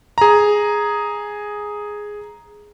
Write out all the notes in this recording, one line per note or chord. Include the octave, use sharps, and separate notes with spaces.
G#4 A#5